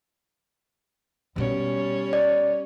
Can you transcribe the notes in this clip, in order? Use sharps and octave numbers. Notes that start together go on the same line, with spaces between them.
B2 G3 B3 C#4 C#5
D5